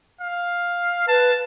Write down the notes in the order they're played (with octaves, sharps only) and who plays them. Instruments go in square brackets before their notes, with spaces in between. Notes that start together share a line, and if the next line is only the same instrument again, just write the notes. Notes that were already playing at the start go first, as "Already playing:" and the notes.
[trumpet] F5
[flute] B4 [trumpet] A5